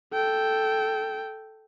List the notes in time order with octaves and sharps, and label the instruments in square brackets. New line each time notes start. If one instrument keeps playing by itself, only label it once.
[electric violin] A4 G5